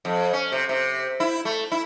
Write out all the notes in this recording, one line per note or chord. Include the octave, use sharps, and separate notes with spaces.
F2
C#4
C3
C3
E4
A3
E4